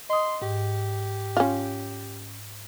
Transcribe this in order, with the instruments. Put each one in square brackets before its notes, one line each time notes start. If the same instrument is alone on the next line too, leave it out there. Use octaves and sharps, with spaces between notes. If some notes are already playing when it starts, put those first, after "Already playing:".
[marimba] D#5 D#6 [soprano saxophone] C6
[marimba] G#2 [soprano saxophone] G4
[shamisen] C#4 F4